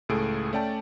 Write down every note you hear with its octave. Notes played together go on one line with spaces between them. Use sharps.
C#2 A2 A3 G#4 A4 D7
A3 C#4 D5 G5 A5